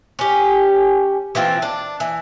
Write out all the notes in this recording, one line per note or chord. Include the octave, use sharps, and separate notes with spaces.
C#4 G4
E3 F3 C4 F4
D4
E3